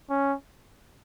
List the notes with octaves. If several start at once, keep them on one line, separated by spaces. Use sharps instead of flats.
C#4